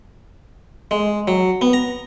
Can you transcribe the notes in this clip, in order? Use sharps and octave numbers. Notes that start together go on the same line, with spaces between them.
G#3
F#3
B3
A#5